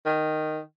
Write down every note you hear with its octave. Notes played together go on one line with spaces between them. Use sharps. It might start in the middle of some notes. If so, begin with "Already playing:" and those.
D#3